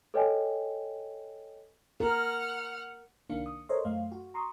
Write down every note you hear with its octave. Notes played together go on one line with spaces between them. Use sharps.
A4 B4 C#5 D#5 G5 G#5
A#4 F#5 F6
C2 D#3 A#3 D4 F5 C#7
D#6
A4 A#4 C5 C#5 D#5 C6
F#2 A3 F5
F#4
A#5 C6 C#6 D#6